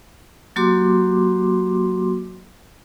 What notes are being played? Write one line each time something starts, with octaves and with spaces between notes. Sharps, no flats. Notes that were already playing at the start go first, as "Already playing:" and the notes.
F#3 A#3 F#4 G4 C6 D6